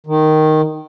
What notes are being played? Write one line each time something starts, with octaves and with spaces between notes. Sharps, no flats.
D#3